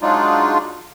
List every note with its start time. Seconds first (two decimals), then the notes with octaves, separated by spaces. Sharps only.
0.01 F#3 G#3 D4 D#4 F4